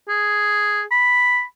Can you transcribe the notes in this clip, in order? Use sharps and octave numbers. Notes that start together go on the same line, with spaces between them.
G#4
B5